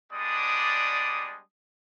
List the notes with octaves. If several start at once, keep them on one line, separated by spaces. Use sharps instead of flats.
G3 G#3 B3 D4 D5 D#6